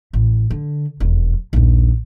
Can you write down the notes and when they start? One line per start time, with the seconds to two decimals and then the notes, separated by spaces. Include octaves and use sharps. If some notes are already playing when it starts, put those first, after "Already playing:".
0.13 A1
0.50 D3
1.00 E1 F2
1.53 A#1 D#2